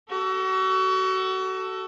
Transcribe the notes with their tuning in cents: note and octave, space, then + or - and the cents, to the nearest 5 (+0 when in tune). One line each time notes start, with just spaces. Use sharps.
F#4 +30 A4 +10